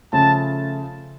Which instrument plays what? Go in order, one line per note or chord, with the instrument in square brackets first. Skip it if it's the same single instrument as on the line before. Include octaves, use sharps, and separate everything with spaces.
[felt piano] C#3 F3 A3 C#4 F4 [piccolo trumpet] A5